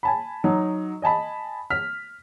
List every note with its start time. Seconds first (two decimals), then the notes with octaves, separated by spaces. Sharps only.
0.03 G#5 A5 B5
0.44 F#3 D#4
1.02 D#5 G#5 A5 B5
1.70 F6 B6